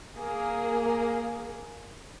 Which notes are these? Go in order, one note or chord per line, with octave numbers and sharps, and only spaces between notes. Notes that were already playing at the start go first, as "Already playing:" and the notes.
A#3 G#4